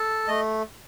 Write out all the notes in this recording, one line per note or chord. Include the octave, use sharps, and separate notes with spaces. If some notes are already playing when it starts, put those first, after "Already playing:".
Already playing: A4 A5
A3 D#5